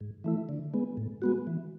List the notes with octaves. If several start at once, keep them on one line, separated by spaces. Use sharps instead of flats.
G#2
E3 A3 E4
D3
G#3 B3
A2
G#3 B3 F#4
E3